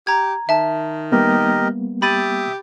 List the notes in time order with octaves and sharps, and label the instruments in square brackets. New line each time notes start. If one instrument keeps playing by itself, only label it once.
[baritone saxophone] G4 [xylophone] A#5 G#6
[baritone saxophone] D#3 [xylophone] E5 A5
[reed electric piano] G3 A#3 B3 [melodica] G4 A#4 D#5
[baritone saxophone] G4 [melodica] E5 D#6 [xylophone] B5 A6 D#7